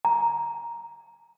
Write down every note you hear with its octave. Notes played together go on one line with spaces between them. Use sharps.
A#5